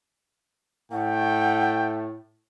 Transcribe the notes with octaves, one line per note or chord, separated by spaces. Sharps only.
A2 A3 F#5 G5